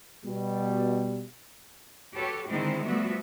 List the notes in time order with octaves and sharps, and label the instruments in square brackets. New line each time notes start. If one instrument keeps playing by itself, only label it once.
[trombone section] B2 G3
[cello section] F#4 G4 A4 B4 C#5
D3 D#3 G#3 C4 D#4 E4
F3 G3 A3 B3 F#4 E5